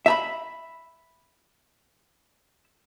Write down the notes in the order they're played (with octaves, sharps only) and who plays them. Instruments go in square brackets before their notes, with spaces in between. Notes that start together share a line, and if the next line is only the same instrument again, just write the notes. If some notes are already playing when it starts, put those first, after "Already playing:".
[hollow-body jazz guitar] E5 A#5 B5